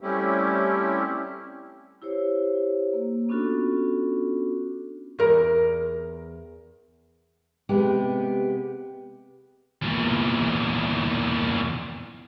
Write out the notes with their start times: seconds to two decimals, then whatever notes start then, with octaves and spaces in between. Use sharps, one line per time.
0.01 G3 A3 C4 C#4 E4 G4
2.02 E4 G4 C5 C#5
2.93 A#3
3.29 B3 C#4 D4 F4 F#4 A4
5.19 E2 A#4
7.69 C3 G#3 B3 G4
9.82 E2 A#2